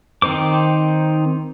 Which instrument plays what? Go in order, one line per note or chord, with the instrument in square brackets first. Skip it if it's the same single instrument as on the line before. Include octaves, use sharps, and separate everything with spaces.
[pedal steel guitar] D#3 C4 D#4 C5 D6